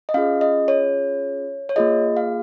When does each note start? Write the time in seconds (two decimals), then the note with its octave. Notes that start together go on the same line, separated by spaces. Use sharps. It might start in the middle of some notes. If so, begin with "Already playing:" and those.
0.09 D#5
0.14 C#4 F4 G#4 F5
0.41 D#5
0.68 C#5
1.69 C#5
1.76 A#3 F4 G#4 D#5
2.17 F5